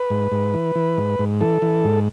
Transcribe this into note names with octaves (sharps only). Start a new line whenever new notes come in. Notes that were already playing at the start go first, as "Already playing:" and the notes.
Already playing: B4
G#2
G#2
E3
E3
G#2
G#2
E3 A4
E3
G#2